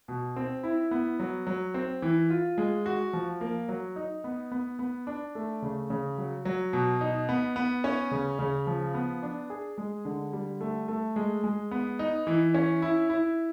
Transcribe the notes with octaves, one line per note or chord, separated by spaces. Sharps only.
B2
C4
E4
B3
F#3
F#3
C4
E3
F4
G#3
F#4
F3
A#3
F#3
D#4
B3
B3
B3
D4
A3
C#3
C#3
F#3
F#3
B2
D#4
B3
B3
C#4
C#3
C#3
F3
B3
D4
G#4
G#3
D3
G3
A3
A3
G#3
G#3
B3
D#4
E3
C#4
E4
E4